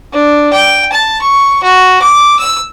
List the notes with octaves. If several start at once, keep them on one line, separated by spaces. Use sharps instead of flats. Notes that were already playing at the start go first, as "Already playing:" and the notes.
D4
G5
A5
C#6
F#4
D6
E6